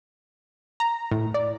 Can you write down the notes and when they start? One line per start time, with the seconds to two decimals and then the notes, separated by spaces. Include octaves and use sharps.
0.80 A#5
1.11 A2
1.34 D5